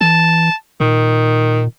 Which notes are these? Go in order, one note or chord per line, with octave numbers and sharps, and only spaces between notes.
E3 A5
A#2 D#3